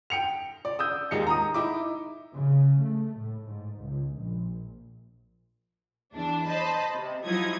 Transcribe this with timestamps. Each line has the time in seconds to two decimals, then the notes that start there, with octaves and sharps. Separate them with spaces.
0.10 G5 C#7 F7
0.65 D5
0.79 D#6 E6 G6
1.11 D#2 G#3 D#4 C#7
1.27 A#5 D#6
1.54 D#4 E4 D6
2.34 C#3
2.82 A3
3.17 A2
3.47 G#2
3.81 C#2
4.17 A#1
6.13 E2 D4
6.44 C5 D#5 A5 B5
6.94 C3
7.25 F3 F#3 D#4 E4 D#6 G#6